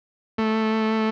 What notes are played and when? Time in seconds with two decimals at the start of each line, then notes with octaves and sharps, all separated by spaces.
0.38 A3